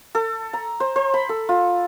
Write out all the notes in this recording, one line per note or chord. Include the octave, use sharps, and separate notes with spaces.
A4
A#5
C5
C5
B5
A4
F4